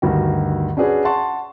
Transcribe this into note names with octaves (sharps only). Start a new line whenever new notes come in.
D2 G2 D#3 F#4
C#4 D4 F#4 G#4 B4
F#5 A5 C6 C#6